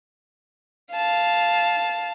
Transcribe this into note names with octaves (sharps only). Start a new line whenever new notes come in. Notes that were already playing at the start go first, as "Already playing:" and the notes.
F5 A5